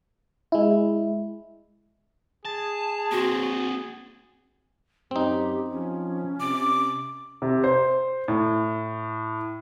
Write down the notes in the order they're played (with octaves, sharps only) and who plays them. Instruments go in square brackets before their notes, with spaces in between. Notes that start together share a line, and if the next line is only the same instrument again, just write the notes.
[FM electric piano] G#3 E4
[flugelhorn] G#4 [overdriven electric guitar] A5
[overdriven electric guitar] A#3 C4 [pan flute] F#4
[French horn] F#2 [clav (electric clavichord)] C4 D#4 [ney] G4
[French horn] F3 [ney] C#4
[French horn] C3 [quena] D6
[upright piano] C3
C5
A2